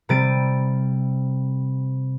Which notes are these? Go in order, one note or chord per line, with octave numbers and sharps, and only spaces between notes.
C3 G3 A6 D7 D#7